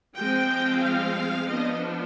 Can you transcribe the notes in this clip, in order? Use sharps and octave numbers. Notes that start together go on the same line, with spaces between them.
F3 G#3 C4 G5
F5
F3 B3 D4 D#5